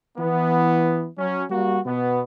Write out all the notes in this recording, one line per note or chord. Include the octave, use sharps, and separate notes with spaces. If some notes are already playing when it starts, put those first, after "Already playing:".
E3 B3
F#3 C#4
G3 A#3 F#4
B2 B3